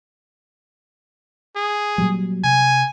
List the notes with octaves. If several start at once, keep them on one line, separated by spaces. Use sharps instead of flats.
G#4
A#2 F#3 G3
C3 G#5